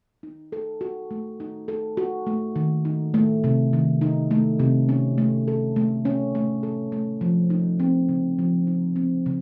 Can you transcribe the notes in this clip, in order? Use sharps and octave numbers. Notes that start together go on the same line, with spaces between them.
D#4
A4
F#4
A3
D#4
A4
F#4
A3
D#3
D#4
A3
C3
D#3
D#4
A3
C3
C#4
A3
A4
A3
C#4
A3
A4
A3
F3
D#4
C4
C#3
F3
D#4
C4
C#3